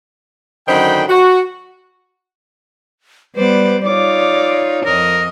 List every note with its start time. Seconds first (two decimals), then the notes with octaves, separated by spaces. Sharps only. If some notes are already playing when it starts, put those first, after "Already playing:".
0.68 F#2 D3 D#3 C5 G5 B5
1.08 F#4
3.36 G3 B3 B4 C5 D5
3.86 D#4 F4 C#5 D5 D6
4.86 F2 A#4 D#5